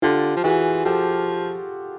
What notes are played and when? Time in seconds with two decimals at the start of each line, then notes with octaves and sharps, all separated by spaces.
0.02 D3 F4 G4
0.37 F3
0.44 E3 F#4 G#4
0.85 F3 G4 A4